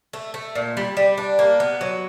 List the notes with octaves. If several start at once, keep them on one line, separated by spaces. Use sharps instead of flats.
A3
A3
A#2
G3
G3
D4
A#3
B3
F#3